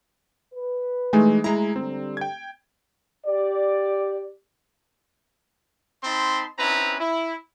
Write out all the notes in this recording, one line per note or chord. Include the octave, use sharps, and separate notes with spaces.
B4
E3 G#3 A3 D#4 G#5
G#3 E4 A#5
D3 G3 C4
G5 G#6
G4 D5
C4 D#4 A5 B5 C6
C4 C#4 D#4 E4 B4 A#5
E4